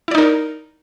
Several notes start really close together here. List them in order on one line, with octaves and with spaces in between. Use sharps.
E4 D5 D#4 A#4